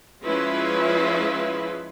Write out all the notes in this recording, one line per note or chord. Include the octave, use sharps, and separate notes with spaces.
F3 G#3 C#4 E4 F4 B4